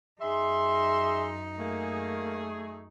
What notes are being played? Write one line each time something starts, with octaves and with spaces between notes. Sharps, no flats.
F#2 D#4 G#4 E5 C6
A3 A#3 G#4